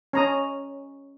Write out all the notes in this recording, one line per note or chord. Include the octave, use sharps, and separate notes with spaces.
C#4 A#5 D#6